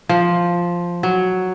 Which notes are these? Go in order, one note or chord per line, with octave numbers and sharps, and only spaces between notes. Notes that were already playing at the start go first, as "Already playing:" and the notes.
F3
F#3